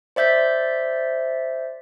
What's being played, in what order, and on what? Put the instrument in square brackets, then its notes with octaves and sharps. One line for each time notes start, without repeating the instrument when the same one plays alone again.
[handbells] C5 D5 E5 G6 B6